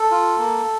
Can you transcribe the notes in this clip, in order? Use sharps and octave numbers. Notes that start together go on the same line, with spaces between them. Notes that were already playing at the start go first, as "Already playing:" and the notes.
Already playing: A4
F4
A#3